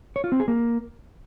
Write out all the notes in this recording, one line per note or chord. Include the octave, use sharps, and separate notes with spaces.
C#5
F4
C4
G#4
A#3